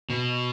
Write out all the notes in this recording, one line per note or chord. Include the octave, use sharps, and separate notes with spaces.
B2